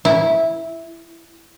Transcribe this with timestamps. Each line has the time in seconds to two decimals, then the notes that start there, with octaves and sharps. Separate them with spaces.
0.05 E4